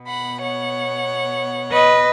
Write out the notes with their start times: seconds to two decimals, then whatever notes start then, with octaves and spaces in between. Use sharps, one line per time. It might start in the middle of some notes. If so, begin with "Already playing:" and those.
Already playing: B2 B3
0.08 F#5 B5
0.42 C#5 F#5
1.73 B4 D#5